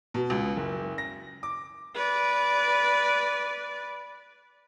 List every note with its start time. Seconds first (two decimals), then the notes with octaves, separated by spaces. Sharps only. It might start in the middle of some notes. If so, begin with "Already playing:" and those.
0.14 B2
0.30 C#2
0.56 F#1
0.98 A#6
1.43 D6
1.95 B4 D5